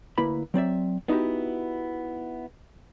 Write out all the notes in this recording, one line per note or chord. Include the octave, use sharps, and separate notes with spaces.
D2 A#3 E4 B4 B5
F#3 C4 D5 E5
B3 D#4 E4 F#4 G4